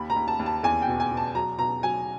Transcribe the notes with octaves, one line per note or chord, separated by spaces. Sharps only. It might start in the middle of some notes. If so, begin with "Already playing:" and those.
Already playing: D#2 B5
A#5
D#2
A5
D#2
A5
E2 G#5
G5
B2
G#5
B2
A5
F#3 A#5
B2 A#5
F#3 G#5